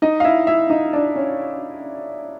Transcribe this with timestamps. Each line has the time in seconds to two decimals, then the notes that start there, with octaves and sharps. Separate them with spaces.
0.02 D#4 D#5
0.20 F5
0.24 E4 E5
0.47 E4 E5
0.70 D#4 D#5
0.93 D4 D5
1.16 C#4 C#5